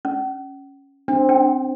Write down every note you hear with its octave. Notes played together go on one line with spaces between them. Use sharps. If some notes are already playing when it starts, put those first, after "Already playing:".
C#4
C4 D4
C#4 D4 G5